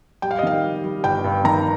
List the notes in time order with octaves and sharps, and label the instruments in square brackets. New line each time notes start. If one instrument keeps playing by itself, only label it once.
[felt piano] G3 G5
F5
D#5
D#3 F5
G3
G3
G1 G5
G2
D#3 A#5